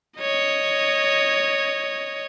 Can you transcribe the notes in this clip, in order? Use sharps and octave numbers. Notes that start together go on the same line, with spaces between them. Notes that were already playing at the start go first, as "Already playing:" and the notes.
C#5 D#5